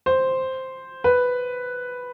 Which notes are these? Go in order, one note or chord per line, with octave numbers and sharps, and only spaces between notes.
C5
B4